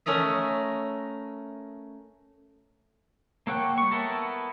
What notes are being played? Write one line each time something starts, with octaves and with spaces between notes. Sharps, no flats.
A3 C#4 A#4 D#5 E5
A#3 A4 C#5 F#5 G5
G3 C#6
B3 E4 A4 A#4 A5